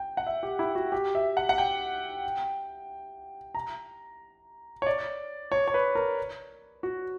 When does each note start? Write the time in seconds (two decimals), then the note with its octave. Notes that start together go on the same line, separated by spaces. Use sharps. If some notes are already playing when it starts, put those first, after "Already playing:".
Already playing: G5
0.17 F#5
0.26 E5
0.43 G4
0.59 E4
0.75 F#4
0.92 G4
1.15 E5
1.37 F#5
1.49 F#5
1.58 G5
3.55 A#5
4.82 C#5
4.87 D5
5.52 C#5
5.68 C#5
5.74 B4
5.95 A#4
6.83 F#4